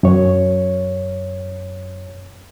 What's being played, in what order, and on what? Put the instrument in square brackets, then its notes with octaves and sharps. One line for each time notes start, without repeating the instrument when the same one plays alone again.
[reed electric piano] F#2 C#5